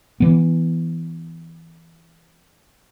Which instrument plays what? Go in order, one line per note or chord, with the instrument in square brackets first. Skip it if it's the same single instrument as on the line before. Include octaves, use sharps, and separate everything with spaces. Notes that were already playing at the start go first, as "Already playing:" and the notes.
[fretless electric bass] E3 B3